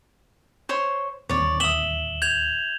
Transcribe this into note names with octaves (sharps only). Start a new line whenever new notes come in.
C5 C#5 C6
D1 D#2 C4 C#5 D5
E5 D#6 E7 F#7 G7
G6 G#6 F7